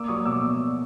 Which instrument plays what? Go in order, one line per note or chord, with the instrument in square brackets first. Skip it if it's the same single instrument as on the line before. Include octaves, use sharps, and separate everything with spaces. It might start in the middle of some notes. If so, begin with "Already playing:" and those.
Already playing: [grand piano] A#3 D6 E6
F#3 C#6 D#6
B2 D6 E6